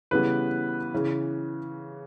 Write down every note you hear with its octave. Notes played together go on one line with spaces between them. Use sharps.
C#3 E3 G3 B3 B4
C#3 E3